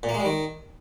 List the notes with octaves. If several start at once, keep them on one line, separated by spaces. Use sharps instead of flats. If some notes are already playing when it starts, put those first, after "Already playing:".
A#2
A#3
G#3
G3
D#3